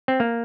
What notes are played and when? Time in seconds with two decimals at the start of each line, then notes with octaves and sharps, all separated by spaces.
0.08 C4
0.20 A#3